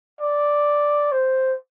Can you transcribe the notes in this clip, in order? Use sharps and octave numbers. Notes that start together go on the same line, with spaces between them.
D5
C5